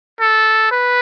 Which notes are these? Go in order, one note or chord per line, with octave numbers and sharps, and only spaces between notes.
A4
B4